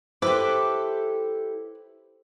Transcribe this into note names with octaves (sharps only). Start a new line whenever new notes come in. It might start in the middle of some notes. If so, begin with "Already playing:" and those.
E4 G4 A4 B4 C5 D6